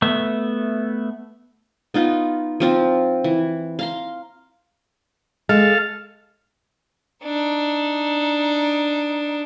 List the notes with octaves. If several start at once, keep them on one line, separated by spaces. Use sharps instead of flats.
A3 B3 E5
B3 D#4 F4
F3 C4 F4
E3
F5 A#5 C6
G#3 A4 F5
D4 D#4